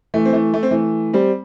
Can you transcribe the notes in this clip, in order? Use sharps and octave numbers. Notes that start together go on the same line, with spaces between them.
E3 A3
C4
E3 A3
A3
C4
E3 A3
G3 C4